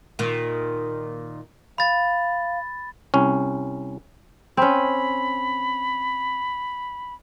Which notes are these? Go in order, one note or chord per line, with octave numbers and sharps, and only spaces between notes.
A#2 D#3
F5 B5 A6
C2 C#4
C4 C#4 B5